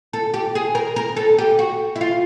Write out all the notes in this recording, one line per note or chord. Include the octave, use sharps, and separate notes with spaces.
A4
G4
G#4
A#4
A#4
A4
G4
F#4
E4
F4